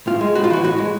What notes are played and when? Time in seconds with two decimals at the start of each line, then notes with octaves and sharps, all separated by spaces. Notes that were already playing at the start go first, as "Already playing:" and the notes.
0.07 A2 F4
0.21 G#3
0.35 A2 F#4
0.44 F4
0.50 E3 F#4
0.64 A2 F#4
0.78 G#3